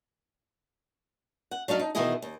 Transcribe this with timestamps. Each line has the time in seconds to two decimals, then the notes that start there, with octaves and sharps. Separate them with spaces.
1.51 F#5
1.68 F#3 D4 D#4 F5
1.79 D#4
1.95 B2 D#3 E3 E4 G#4 D#5
2.22 D#2